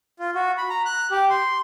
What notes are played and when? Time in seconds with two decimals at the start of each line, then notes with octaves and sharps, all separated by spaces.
0.19 F4
0.35 F#4
0.58 B5
0.70 A#5
0.86 F#6
1.11 G4
1.30 C6